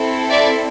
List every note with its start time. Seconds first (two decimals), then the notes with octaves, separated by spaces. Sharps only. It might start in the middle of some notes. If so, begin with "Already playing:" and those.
Already playing: C4 E4 A4
0.29 D5 E5